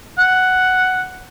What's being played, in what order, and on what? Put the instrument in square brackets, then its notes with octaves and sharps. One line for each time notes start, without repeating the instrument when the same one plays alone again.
[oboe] F#5